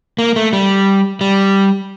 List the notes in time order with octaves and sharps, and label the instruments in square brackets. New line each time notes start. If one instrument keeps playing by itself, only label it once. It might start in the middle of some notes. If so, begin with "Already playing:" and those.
[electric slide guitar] A#3
A3
G3
G3